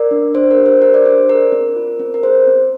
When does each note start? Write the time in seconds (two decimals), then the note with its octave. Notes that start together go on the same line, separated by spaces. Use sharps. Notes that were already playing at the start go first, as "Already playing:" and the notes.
Already playing: A#4 D5
0.11 D4
0.34 D4 C5
0.51 A#4
0.58 G4
0.66 C5
0.82 G4 A#4
0.94 D5
1.05 D4 C5
1.29 G#4 A#4
1.52 C4
1.76 F4
2.00 C4
2.14 A#4
2.23 G#4 C5
2.47 C4